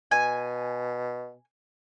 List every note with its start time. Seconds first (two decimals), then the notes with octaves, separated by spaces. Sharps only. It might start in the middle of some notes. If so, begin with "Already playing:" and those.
0.11 B2 G#5